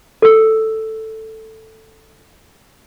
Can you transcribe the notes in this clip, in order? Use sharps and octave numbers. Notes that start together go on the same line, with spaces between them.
A4 E6